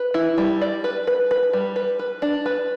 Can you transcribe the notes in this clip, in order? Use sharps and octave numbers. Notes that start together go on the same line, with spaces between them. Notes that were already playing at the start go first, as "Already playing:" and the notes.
Already playing: B4
E4
G3
D5
B4
B4
B4
G3
B4
B4
D4
B4